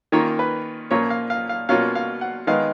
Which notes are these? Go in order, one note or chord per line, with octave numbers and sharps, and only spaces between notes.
D#3 A#3 C#4 F4 C#5
B4
A#2 F3 A#3 C#4 F4 C#5
F5
F5
F5
B2 A#3 C#4 F4 F5
F5
F#5
D#3 G#3 B3 D#4 F5